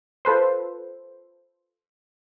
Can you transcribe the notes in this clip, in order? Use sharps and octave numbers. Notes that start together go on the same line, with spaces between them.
F4 A4 B4 C5